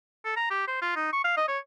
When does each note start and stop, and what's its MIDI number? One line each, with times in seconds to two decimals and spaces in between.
0.25 0.33 69
0.36 0.46 82
0.51 0.65 67
0.68 0.78 72
0.82 0.93 65
0.96 1.08 63
1.13 1.24 85
1.24 1.32 77
1.37 1.45 75
1.48 1.58 73